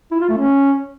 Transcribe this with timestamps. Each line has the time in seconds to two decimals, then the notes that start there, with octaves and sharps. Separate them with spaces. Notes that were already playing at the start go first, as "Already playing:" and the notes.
0.11 E4
0.20 F4
0.29 A3
0.38 C#4